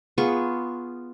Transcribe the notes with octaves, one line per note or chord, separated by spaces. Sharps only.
B3 F4 G#4 C#6